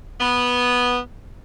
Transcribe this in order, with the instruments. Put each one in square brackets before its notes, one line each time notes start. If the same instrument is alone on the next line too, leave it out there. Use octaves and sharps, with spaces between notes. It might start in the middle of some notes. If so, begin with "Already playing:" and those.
[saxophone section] B3